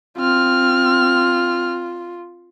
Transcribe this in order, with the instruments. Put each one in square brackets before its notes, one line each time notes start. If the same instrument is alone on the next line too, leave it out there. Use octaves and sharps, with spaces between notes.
[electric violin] C4 F6 [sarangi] F4